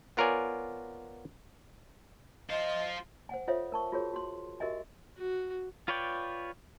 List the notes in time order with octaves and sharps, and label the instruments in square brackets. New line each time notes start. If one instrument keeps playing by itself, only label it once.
[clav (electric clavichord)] B3 F4 A#4 C#5 D5 G#5
[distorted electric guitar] F4 C5 [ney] D#5
[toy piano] C5 F#5 G#5
F4 A4 C5 C#5 E5 F5
A#4 A5 C#6
F4 F#4 G#4 A#4 C#5
F#4 C6
F#4 G4 A#4 D#5 E5 G#5
[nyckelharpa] F#4
[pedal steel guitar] F4 B4 C#5 D5 G5